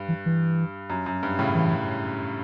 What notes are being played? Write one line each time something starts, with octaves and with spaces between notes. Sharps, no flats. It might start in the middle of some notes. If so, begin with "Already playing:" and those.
Already playing: G2
E3
E3
F#2
F#2
G2
A2 C#3
E3